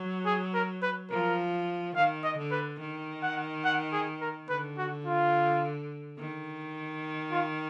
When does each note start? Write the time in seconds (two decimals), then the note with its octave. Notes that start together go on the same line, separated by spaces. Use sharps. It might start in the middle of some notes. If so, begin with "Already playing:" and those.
Already playing: F#3
0.26 G#4
0.54 A#4
0.82 B4
1.11 F3 A#4
1.95 D#3 F5
2.24 D#5
2.38 D3
2.51 B4
2.80 D#3
3.22 F#5
3.64 F#5
3.93 G#4
4.21 A#4
4.49 D3 B4
4.78 F#4
5.06 F4
6.19 D#3
7.31 F4